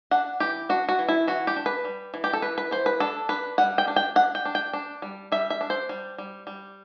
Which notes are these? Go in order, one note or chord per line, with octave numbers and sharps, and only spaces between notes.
D4 F#5
E3 G4
D4 F#4
F#4
E3
E4
E3 F#4
G4
D4
B4
G3
E3
G4
A4
E3 B4
B4
E3 C5
B4
D4 A4
D4 B4
G3 F#5
G5
D4
G5
D4 F#5
G5
D4
G5
D4
G3
G3 E5
E5
D4
C5
G3
G3
G3